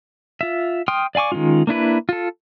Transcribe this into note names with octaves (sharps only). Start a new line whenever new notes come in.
F4 E5
G5 C6 D#6 F6
D5 F5 G#5 C#6 D6
D#3 G#3 C4 C#4 F4
A#3 D4 E4 B4
F4 A4